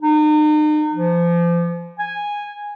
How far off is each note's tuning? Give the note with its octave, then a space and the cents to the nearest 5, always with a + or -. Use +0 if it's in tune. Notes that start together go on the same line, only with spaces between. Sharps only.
D#4 -40
F3 -30
G#5 -10